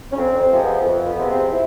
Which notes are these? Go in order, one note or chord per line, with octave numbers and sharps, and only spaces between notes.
C#4
F2 C4
C4
C3 F3 G#3
B3
F2
B3
C3 F3 G#3
C4
E4